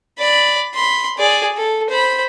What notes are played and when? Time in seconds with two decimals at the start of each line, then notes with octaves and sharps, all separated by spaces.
0.19 D5 B5
0.75 B5 C6
1.17 G#4 D5
1.57 A4
1.90 C5 B5